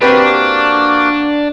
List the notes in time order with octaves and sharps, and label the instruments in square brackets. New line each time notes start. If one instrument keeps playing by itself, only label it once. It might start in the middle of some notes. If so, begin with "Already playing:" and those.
[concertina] A#3 F#4 [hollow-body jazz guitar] C4 G4 B4 [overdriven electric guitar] D4